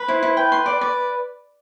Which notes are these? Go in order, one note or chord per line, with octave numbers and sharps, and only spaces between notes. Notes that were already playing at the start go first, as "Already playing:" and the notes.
Already playing: B4
E4 C5
E4
B4 G5
C6
D5
D5